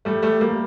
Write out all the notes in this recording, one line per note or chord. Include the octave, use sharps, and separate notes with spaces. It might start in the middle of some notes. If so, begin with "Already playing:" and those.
G3 A3
G3 A3
G3 A#3